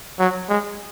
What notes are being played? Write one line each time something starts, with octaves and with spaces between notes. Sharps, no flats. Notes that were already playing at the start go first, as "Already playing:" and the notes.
F#3
G#3